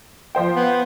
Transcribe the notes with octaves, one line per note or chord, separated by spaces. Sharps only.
F3 C5 G5
B3